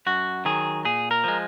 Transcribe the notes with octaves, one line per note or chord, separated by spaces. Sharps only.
F#2 F#4
D#3 F#3 G#4
A#2 G#4
A#4
F3 G#3